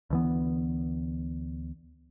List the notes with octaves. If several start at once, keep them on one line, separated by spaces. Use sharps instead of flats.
D2 E3 B3